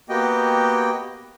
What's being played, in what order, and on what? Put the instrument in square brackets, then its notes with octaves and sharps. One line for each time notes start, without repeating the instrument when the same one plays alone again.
[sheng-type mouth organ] A#3 B3 F#4 G4 D#5 G5